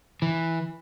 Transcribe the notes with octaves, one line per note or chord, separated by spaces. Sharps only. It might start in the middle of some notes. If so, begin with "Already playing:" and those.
E3